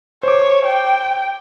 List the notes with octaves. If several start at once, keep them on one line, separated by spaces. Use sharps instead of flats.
C5 C#5 D6
G5